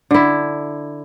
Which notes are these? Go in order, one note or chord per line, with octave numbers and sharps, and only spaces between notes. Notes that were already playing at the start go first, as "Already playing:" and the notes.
D3 E4